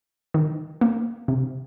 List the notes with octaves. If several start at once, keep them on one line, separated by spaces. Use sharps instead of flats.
D#3
A#3
C3